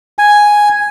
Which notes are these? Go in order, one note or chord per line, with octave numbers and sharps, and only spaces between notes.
G#5